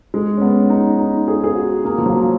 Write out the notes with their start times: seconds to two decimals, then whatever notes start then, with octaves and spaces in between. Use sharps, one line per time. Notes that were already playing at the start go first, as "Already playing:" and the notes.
0.14 G#3
0.38 C#4
0.42 B3
0.70 D#4
0.99 D#4
1.28 G#4
1.44 G#4
1.55 F#4
1.85 A#3
1.98 F3
2.06 F#3